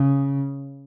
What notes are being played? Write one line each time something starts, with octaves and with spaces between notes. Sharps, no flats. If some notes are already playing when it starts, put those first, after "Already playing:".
Already playing: C#3